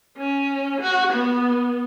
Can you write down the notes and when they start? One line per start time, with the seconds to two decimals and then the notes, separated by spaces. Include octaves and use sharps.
0.17 C#4
0.81 F#4
1.13 B3